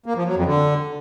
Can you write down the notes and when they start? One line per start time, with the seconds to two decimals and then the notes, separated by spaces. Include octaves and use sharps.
0.06 A#3
0.16 F3
0.26 F#3
0.36 F2
0.45 D3